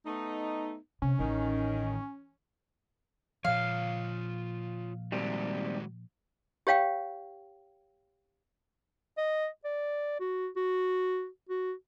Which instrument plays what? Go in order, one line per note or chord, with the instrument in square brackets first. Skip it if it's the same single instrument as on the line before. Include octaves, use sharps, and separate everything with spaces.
[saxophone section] A3 B3 D#4
[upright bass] C3 [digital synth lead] C#4
[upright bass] A1 [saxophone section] D#3
[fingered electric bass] A#2 F3 [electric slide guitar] F4 C#5 [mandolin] F5
[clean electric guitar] D#2 C3 G3 [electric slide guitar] D#3 G#3 F#4
[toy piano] G4 C#5 F5 G5
[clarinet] D#5
D5
F#4
F#4
F#4